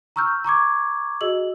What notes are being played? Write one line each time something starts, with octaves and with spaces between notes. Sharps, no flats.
A#5 C#6 E6 F6 G6
A#5 C#6 D6 G#6
F#4 G#4 D#5 E6 F#7